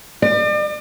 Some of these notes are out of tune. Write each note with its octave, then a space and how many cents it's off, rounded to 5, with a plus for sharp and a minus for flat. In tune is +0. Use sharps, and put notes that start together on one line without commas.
D5 +40